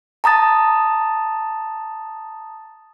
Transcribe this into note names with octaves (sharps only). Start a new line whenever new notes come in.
A5 A#5 D#6 A6